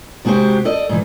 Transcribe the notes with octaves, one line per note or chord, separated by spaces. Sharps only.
C3 G#3 F#4 G4 C5
A4 D5 D#5
G#2 E3